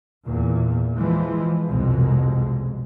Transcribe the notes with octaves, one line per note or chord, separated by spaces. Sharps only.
E2 A#2
E3 F3 G#3
C2 F2 B2 G#3